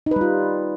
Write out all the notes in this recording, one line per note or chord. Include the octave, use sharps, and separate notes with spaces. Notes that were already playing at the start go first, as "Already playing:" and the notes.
G3 D#4 F4 B4